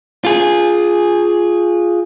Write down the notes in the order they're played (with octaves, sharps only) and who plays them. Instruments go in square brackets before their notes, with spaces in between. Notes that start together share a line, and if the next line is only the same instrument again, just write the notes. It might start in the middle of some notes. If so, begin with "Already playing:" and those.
[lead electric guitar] F4 G#4